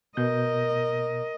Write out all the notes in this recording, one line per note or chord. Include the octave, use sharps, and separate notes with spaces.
B2 A#4 D#5 G6